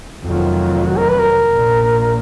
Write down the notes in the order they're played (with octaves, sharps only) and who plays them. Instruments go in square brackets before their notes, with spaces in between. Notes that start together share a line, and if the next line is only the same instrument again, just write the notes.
[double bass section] F1 F2 D#3 F#3 [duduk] F4
[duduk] F#4
A#4
B4
A#4
[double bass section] A#1 A#2